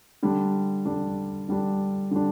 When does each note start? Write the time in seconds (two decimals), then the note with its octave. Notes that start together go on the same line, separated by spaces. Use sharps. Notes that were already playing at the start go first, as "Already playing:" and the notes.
0.23 D3 G3 D4
0.85 D3 G3 D4
1.48 D3 G3 D4
2.11 D3 G3 D4